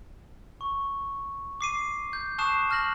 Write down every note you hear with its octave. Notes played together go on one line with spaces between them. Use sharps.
C#6
D6 C7 D#7
G6
A5 C#6 D#6 F#6 C7 E7
A5 F6 F#6 A#6 F#7